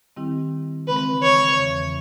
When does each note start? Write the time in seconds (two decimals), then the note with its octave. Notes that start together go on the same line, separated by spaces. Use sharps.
0.16 D#3 G3 C4 E4 G4
0.87 C#3 E3 G#3 C4 B4
1.23 C#5
1.58 E2 C#3 E3